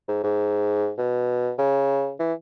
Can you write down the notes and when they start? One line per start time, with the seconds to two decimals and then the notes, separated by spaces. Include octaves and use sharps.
0.08 G#2
0.23 G#2
0.98 B2
1.58 C#3
2.19 E3